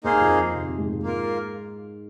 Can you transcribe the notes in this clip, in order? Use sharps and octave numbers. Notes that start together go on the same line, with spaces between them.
D#2 D#3 A#3 D#4 G#4 C5 F5
F2 F3
C3
C3
G#2 G#3
G#2 G#3
A#3 F4 A#4